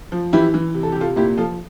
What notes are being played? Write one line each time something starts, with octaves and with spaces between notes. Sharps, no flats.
F3
E3 E4 G4
E3
C3
A4
C3 G4
F4 A4
A#2 E4 G4
F3 F4 A4